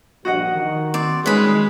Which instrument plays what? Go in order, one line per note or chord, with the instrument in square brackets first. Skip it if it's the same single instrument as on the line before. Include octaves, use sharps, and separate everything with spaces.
[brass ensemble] A#1 G2 [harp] F#4 D#5 F#5
[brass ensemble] D#3
[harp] C4 [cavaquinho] D5
[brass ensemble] D#3 G3 C#4 [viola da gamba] G#3 [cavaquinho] B4 B5